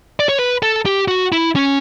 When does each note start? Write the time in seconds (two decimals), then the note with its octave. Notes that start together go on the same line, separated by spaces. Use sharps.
0.20 D5
0.29 C#5
0.39 B4
0.63 A4
0.86 G4
1.08 F#4
1.32 E4
1.56 C#4